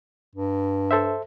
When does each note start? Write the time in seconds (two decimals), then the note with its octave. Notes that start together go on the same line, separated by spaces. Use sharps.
0.35 G2
0.91 A4 C5 E5